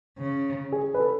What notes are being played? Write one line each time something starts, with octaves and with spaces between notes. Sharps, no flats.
C#3
G#4
B4
A4